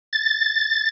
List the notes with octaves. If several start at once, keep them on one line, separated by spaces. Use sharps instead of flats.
A6